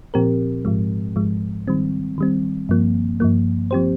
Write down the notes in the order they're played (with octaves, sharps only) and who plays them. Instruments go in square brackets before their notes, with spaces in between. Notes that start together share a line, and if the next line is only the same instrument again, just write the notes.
[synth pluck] A#2 F3 C4 G4 A#4
G#2 F3 G#3
G#2 F3 G#3
D#3 G3 C4
D#3 G3 C4
G2 F3 A#3
G2 F3 A#3
F3 C4 G4 C5